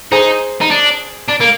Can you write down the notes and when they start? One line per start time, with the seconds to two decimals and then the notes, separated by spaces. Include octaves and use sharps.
0.12 D#4 G#4 C5
0.61 D#4
0.71 D4
1.28 D4
1.40 A#3